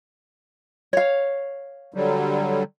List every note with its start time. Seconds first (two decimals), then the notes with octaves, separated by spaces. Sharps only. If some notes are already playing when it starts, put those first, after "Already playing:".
0.93 C#5 F5
1.94 D3 F#3 G3